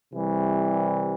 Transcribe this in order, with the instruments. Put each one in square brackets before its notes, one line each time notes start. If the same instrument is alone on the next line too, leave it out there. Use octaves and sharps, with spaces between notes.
[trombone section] C2 C3 E3 G3